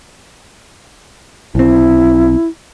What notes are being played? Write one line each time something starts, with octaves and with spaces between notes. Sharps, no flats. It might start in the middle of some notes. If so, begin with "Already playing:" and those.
B1 C4 E4